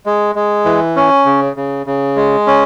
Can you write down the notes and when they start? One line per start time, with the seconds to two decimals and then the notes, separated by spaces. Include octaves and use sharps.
0.06 G#3
0.35 G#3
0.65 E3
0.96 C#4
1.25 C#3
1.56 C#3
1.86 C#3
2.16 G#3
2.47 C#4